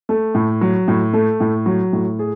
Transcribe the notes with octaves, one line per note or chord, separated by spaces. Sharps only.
A3
A2
F#3
A2
A3
A2
F#3
A2
G#4